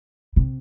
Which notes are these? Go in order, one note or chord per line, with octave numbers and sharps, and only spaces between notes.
C3